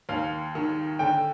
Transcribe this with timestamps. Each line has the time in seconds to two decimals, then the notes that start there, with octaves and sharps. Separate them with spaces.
0.09 D#2 F5
0.55 D#3
0.99 D3 G5